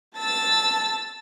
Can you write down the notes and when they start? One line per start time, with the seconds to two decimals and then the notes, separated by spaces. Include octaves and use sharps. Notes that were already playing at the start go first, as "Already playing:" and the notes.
0.18 A5 E6 A6